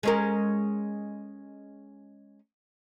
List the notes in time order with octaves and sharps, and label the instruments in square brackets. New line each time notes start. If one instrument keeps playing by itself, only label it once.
[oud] G#3 C#4 A#4